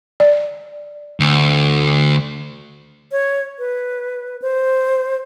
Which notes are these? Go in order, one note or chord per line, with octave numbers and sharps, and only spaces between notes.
D5
D2
C#5
B4
C5